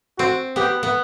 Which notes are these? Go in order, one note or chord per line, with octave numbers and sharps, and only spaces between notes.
C4 F#4
B3 G4
B3